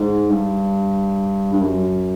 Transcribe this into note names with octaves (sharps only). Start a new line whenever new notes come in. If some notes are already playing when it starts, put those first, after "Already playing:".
Already playing: G#2
G2
G2
F#2